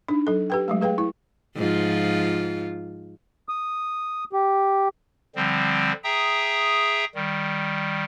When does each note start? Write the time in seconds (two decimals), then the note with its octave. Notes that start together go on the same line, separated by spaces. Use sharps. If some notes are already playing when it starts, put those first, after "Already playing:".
0.08 D4 D#4
0.27 F#3 A4
0.50 G4 B4 G5
0.68 F#3 G#3 A3
0.81 G#4 B4 F5 G5
0.98 E4
1.56 G#2 F3 F4
3.49 D#6
4.33 G4
5.36 D3 F3 G3 C4
6.04 G#4 E5 G5 A#5 D#6
7.15 D#3 G3